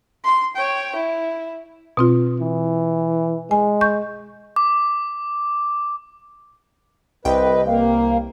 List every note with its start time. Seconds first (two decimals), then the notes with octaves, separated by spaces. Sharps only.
0.24 C6
0.56 C#5 G5
0.95 E4
1.97 B2 C4 F4
2.41 E3
3.51 G#3 G#5
3.81 C#6 G6
4.56 D6
7.25 C2 B4 D#5 G5
7.66 A#3 F5